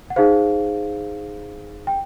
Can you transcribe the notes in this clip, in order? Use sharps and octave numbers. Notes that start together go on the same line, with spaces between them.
F#5
D#4 G#4 C5 F5
G5